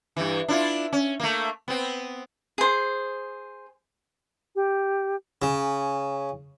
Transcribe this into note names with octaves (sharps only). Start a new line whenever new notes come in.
G2 E3
D4 E4 F4
C#4
A3 A#3
B3 C4
G#4 C5
G4
C#3 G#5